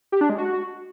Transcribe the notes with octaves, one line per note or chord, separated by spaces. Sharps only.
G4
D4
G#3
F#4